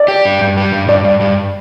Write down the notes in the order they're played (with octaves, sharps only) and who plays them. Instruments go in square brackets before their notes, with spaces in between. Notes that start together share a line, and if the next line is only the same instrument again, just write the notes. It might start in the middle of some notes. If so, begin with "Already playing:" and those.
Already playing: [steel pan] D5
[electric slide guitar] G4
G2
G2
G3
G2
[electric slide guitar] G2 [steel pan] D5
[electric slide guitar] G2
G2